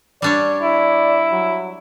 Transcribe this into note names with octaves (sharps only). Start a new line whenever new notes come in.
G3 D4 C#5 D5
E4
F#3